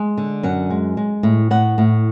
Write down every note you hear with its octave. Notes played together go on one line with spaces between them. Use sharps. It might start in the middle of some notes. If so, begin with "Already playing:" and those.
Already playing: G#3
D3
F#2 F#5
G#3
G#3
A2
A2 F#5
A2